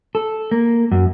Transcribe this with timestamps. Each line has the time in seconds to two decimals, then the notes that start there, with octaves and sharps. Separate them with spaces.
0.15 A4
0.51 A#3
0.91 F#2